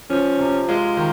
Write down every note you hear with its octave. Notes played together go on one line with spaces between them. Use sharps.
F3 C#4
C3
G#3 F4
D#3